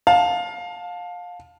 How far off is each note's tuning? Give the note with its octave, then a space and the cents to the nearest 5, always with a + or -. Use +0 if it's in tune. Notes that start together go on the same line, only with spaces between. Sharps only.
F5 +25 A5 +0